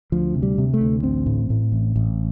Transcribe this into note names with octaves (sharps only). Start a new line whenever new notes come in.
D2 F3
C3
G3
C3
A3
D2
A1 C4
A2
A2
A1
A1